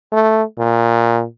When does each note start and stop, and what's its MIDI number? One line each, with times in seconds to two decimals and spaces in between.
0.12 0.43 57
0.58 1.24 46